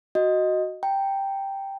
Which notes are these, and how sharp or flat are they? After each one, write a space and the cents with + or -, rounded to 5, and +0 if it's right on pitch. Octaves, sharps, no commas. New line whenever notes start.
F#4 +0 D#5 +0
G5 +0 A#5 -15